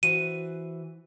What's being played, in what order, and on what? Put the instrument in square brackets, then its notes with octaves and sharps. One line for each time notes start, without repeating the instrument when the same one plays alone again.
[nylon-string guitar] E3 F#4 C5 [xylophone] D#7